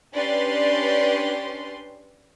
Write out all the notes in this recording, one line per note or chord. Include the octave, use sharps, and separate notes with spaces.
C#4 D4 G4 B4 D5 C6